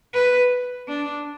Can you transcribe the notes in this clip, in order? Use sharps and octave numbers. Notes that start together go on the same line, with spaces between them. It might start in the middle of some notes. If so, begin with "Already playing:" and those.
B4
D4